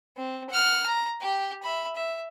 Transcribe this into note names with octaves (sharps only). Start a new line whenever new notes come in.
C4
F#5 F6
A#5
G4 G5
E5 B5
E5